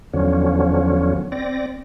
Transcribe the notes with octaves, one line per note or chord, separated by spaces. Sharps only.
E2 D3 F3 F#3 C#4
C4 D5 A#6